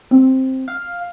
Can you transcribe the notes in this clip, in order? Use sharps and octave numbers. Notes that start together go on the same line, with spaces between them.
C4
F5